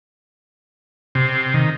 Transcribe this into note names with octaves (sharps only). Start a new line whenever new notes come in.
C3
D#3